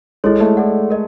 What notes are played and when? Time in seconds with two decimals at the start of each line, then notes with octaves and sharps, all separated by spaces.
0.24 G#3 E4 A4 C#5
0.40 A3
0.57 A4 D5 F#5
0.90 A#4 D#5